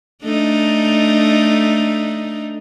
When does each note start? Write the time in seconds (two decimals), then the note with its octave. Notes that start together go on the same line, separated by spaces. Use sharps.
0.24 A3 D4 D#4